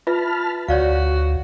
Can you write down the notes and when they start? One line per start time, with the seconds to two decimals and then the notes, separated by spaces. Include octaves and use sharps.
0.07 F4 B4 E5 A5 B5 F6
0.68 D2 F#4 C#5 D5 F5